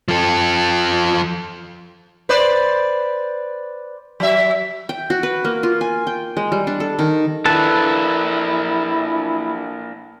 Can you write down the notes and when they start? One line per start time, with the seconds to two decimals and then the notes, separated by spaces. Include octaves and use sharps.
0.08 F3 A4
2.29 B4 C5 D5
4.20 F#3 E5
4.89 G5
5.10 F#4
5.23 B4
5.45 A#3
5.63 F4
5.81 G#5
6.07 G5
6.37 G#3
6.52 G3
6.67 D4
6.80 A4
6.99 D#3
7.45 A#3 D4 E4 A4 B4 A5